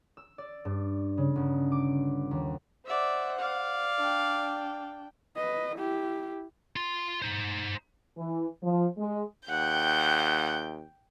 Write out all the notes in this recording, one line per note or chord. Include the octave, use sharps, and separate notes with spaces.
E6
D5
G2
C#3
G1
D6
D#2
C5 D5 E5 F#5
D5 F5
D4 G5
B4 D#5
E4 G4
F4 C6
D#4 C5
E3
F3
G#3
D#2 F#5 G5 G6